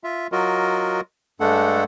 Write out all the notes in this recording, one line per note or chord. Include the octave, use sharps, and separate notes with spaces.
F4 E5
F#3 F4 F#4 A#4 D#5
G2 G#3 A3 D4 A4 F#5